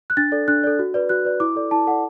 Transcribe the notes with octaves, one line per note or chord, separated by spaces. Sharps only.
F#6
D4 A6
A4 D5
D4 F#6
A4 D5
F#4
B4 D5
F#4 F#6
B4 D5
E4 D6
A4 D5
E4 A5
A4 D5 F#5